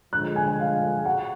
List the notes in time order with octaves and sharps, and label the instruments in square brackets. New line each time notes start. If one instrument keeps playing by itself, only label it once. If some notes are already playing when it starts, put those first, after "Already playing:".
[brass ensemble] D3 F3 G#3 [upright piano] F#6
[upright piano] G#5
F5
[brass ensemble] F#4 [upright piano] F#5